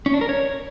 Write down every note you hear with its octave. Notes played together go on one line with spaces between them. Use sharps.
C#4
D4
A#4
C#5